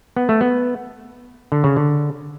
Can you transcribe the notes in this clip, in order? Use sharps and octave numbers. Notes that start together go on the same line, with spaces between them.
B3
A3
B3
D3
C#3
D3